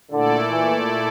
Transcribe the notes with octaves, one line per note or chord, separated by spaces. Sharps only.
A#2 D3 A3 E4 A4 D5
E3